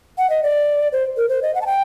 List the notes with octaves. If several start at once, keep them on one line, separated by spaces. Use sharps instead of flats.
F#5
D#5
D5
C5
A#4
C5
D#5
F#5
A5
G5